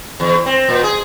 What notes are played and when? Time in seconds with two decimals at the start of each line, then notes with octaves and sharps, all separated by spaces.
0.20 E2
0.46 C4
0.69 A#2
0.83 G#4